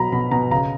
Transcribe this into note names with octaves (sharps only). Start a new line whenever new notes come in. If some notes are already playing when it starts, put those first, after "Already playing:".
Already playing: B2 F#3 A#5 B5
B2 B5
B2 A#5
C#3 A#5